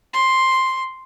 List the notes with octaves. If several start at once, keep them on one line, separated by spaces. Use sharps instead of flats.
C6